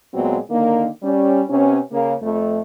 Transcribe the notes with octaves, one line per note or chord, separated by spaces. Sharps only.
A#2 F#3 G#3 B3 C4
D3 D#3 A#3
G3 C#4
C3 B3 C#4
C#3 A#3
F2 A3